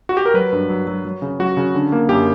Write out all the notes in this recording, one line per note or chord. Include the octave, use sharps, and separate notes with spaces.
F#4
G4
A#4
F#3 B4
G2
F#3
F#3
F#3
C#3
F#3 F#4
C#3
D3
A#3
F#2 G4